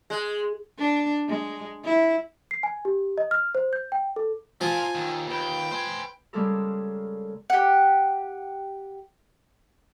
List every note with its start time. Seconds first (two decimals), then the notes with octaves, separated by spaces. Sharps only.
0.10 G#3
0.78 D4
1.28 G#3
1.84 E4
2.51 C7
2.63 G#5
2.85 G4
3.18 D#5
3.31 F6
3.55 C5
3.73 G6
3.92 G5
4.16 A4
4.61 F3 F4 A#4 G#5
4.95 D#2 D#3
5.27 D#2 B4 G5
5.72 C5 G#5
6.33 C#3 G3 G#3 A#3 A4 A#4
7.50 G4 F#5